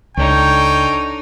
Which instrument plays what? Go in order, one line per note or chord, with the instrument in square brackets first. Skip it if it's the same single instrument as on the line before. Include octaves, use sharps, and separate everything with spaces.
[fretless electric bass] C#2 [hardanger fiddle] D4 D#4 [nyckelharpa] A4 C#5 [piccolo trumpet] G5